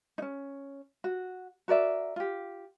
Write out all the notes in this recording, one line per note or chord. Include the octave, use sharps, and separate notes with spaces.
C#4 D#4
F#4
F#4 A#4 D5 E5
F4 G4